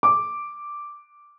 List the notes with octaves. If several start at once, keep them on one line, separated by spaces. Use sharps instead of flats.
D6